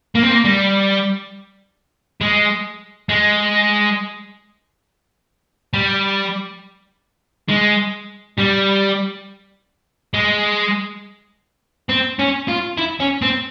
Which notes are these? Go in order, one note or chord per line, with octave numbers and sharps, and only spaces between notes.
A#3
C4
A#3
G3
G#3
G#3
G3
G#3
G3
G#3
C4
C#4
F4
E4
C#4
C4